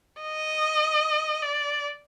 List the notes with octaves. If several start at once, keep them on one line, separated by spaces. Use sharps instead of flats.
D#5
D5